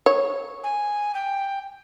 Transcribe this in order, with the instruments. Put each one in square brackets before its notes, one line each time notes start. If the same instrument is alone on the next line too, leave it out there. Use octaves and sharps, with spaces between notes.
[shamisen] C#5
[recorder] G#5
G5